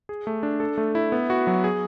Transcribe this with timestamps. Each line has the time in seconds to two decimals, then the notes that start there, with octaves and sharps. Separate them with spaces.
0.09 G#4
0.27 A3
0.43 D4
0.60 A4
0.78 A3
0.95 E4
1.12 B3
1.30 F#4
1.47 F#3
1.64 G#4